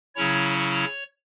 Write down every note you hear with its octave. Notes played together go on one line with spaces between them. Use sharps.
C#3 F#3 C#4 E4 C#5
C#5